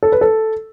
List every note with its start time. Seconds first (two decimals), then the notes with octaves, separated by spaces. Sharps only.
0.03 A4
0.12 B4
0.21 A4